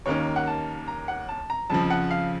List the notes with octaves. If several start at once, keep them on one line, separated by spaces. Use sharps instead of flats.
D#2 D#3 A#3 C#4 C#5
F#5
A5
A#5
F#5
A5
A#5
F2 C#3 F3 A5
F#5
F5